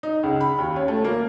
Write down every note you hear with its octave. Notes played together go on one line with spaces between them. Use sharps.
D#4
C#2
B5
D#2
C#4
A3
A#3